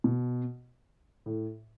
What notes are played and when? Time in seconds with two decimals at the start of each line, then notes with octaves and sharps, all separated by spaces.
0.04 B2
1.26 A2